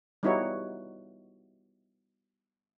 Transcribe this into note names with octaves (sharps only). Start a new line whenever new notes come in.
G3 B3 D#4 E4 F#4 C#5